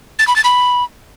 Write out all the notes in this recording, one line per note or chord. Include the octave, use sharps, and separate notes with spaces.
A6
B5
A6
B5